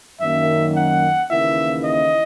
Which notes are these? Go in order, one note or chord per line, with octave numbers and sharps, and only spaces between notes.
F#2 D#3 A#3 E5
F#5
D#2 C#3 E3 A#3 E4 E5
D#5